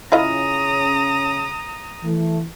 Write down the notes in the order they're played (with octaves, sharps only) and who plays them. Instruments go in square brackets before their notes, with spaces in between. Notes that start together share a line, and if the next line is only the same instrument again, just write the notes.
[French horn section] C#3 C#4 [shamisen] E4 F4 D#5 [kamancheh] A#5 D#6
[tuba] E3 [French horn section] A3